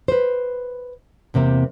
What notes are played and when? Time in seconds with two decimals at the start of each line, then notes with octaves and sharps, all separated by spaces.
0.08 B4 C5
1.34 E2 C3 A#3 C4